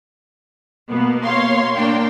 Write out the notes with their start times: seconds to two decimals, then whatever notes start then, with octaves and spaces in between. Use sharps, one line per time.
0.90 B2 A#3 B3
1.23 C#5 F5 C6
1.75 A#3 D4 G5 C6